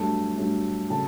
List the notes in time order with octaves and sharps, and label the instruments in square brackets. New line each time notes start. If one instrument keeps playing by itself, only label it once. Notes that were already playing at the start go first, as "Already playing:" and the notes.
Already playing: [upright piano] G2 F#3 A3 A4 A5
G2 F#3 A3
C#3 F#3 A4 A5